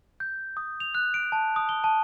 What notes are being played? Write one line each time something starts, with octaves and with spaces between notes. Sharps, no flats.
G6
D#6
F7
F#6
D7
A5
D#6
G7
A5